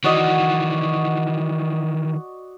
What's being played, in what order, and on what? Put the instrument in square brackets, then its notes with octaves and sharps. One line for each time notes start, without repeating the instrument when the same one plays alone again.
[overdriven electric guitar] D#3 E3 [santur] F#4 D5 D#5